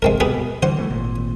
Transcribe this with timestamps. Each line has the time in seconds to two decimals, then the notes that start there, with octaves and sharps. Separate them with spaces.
0.02 G1 C2 F2 G#3 C4 A#4
0.20 B2 G4 G#4 B4
0.63 D3 E3 G3 C5 F#5
0.77 E3 F#3 A3
0.90 G#1 A#2